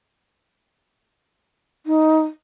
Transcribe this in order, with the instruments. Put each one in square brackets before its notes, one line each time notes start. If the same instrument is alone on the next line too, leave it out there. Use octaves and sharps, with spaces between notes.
[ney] D#4